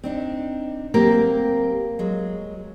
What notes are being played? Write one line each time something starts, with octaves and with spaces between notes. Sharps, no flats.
C4 D4 D#4
F#3 A#3 C4 G4
F#3 G#3